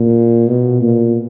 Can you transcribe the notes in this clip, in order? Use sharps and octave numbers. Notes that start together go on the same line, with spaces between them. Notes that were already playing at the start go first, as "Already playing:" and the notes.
Already playing: A#2
B2
A#2